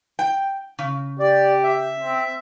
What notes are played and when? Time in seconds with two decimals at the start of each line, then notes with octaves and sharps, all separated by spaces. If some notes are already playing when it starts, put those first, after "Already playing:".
0.19 G5
0.79 C#3
1.20 G4 D5
1.64 E5
2.00 C4